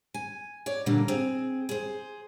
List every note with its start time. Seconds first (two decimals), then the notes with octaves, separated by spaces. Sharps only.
0.14 G#5
0.66 C#5 D5
0.86 A#2 D3 G3 A#3
1.08 C4 G#4
1.69 G#4 C5